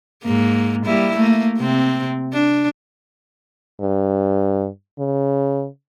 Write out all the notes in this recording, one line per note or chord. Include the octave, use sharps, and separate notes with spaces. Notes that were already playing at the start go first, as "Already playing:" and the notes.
G#2 A#3
G3 A#3 E4
A3 A#3
C3 C4
D4
G2
C#3